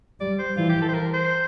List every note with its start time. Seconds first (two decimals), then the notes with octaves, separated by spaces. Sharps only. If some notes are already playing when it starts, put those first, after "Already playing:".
0.19 G3 D5
0.38 C5
0.57 E3 F4
0.69 G4
0.82 A4
0.88 C5
0.94 A#4
1.13 C5